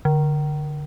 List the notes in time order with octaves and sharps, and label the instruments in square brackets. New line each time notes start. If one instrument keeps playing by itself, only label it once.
[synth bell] D3